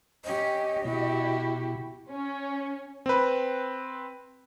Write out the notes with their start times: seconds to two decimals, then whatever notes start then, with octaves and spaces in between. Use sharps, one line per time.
0.24 C#4 G4 D#5
0.85 B2 E4 F#4 G4
2.11 C#4
3.06 C4 B4